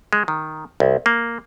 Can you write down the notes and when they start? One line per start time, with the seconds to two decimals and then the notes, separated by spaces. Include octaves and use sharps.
0.13 G#3
0.28 D#3
0.80 C2
1.06 A#3